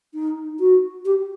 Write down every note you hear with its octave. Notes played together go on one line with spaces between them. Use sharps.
D#4
F#4
G4